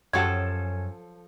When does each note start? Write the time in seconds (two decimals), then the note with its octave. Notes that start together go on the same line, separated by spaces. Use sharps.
0.13 F#2 F3 F#3 C#4 G4 A4 F#5 G#6